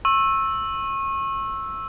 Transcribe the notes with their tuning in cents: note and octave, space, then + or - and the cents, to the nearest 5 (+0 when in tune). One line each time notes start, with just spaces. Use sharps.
C#6 -30 E6 +0